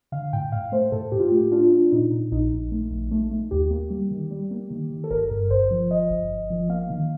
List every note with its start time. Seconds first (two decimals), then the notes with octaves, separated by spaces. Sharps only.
0.12 D3 F5
0.33 A2 G5
0.52 A2 F5
0.72 A3 C5
0.92 A2 A4
1.12 A2 G4
1.20 F4
1.29 A3 G4
1.51 D4 F4
1.72 D4
1.92 A#2 D#4
2.11 A#2
2.31 A#1 D#4
2.52 A#1
2.72 A3
2.91 A#1
3.11 A3
3.31 A3
3.51 D#2 G4
3.71 A#3
3.90 G3
4.11 D#3
4.30 G3
4.51 A#3
4.71 D#3
4.90 D#3
5.04 A4
5.11 G1 A#4
5.31 G2
5.50 G1 C5
5.71 F3
5.90 F3 D#5
6.10 G1
6.30 G1
6.50 F3
6.69 A#3 F5
6.90 D#3